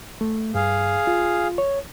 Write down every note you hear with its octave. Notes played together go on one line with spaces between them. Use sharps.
A3
G2 G#4 F5
F4
C#5